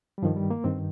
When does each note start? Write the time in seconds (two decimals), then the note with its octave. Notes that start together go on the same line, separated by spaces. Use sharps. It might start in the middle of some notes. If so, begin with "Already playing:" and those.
0.18 G3
0.22 G2 D#3 F3
0.36 G3
0.50 A#3
0.64 G2 D#3 C4